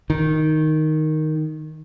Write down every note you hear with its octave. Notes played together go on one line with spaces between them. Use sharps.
D#3